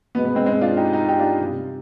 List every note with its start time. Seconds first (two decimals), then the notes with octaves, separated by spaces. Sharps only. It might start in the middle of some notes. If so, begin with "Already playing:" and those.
0.15 B2 G#3 B3
0.25 B3
0.35 G#3 C4
0.46 G#3 C4
0.61 D4 F4
0.77 D#4 G4
0.93 D#4 G4
1.09 D#4 G4
1.19 D4 F4
1.41 C3 G3